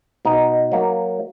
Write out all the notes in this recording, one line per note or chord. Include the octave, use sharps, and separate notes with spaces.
B2 D#4
F#3 A#3